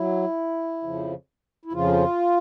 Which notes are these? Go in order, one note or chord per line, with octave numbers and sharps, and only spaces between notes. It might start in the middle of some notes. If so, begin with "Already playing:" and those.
Already playing: F#3 E4
F2 C#3 F3
E4
F2 C#3 F3 F4